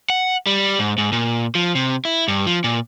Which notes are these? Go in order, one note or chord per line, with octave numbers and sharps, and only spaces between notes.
F#5
G3
G#2
G#2
A#2
F3
C3
E4
G2
F3
A#2